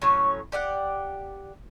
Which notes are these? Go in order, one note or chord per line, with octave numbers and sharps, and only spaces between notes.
A2 F#3 C#4 C#5
G4 D5 F5 F#5